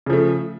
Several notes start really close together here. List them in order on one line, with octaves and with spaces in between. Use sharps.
C#3 F3 A3